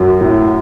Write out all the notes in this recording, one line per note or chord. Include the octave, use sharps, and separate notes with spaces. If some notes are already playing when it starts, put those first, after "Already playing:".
Already playing: F#2
A2